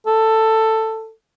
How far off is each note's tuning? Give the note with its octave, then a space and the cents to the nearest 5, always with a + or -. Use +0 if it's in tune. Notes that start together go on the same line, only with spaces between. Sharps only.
A4 +10